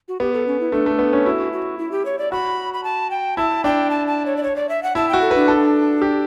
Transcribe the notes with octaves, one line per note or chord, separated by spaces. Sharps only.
F#4
B3 G4
A4
C#4
E4
A3 D4
A3
B3
C#4
E4 F#4
F#4
E4
G4
C#5
D5
F#4 B5
B5
A5
G5
E4 A5
D4 G5
A5
A5
C#5
D5
C#5
D5
E5
F#5
E4 A5
F#4 G5
A4
B4
D4
A4
G4